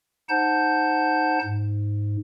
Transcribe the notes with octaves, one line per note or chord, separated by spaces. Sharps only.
D#4 C5 F#5 A5 G6
G#2